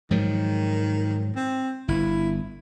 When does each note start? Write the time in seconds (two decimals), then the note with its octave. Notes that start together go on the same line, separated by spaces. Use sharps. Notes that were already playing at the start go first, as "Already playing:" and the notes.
0.11 G#2 D#3 F3 F#3
1.36 C4
1.88 G1 E4